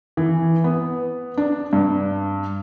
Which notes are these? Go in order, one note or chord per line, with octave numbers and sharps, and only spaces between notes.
E3
B3
D4
G2